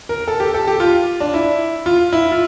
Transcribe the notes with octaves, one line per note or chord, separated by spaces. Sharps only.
A#4
A4
G4
A4
G4
F4
D4
E4
F4
E4
F4